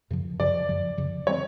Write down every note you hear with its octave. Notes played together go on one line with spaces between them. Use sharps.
F#2 C#3 F3
F#2 C#3 F3 D5
F#2 C#3 F3
F#2 C#3 F3
E3 G3 C4 C#5